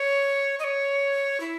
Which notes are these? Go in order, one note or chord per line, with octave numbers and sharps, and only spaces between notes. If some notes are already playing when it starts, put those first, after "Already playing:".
Already playing: C#5
D#5
C#5
E4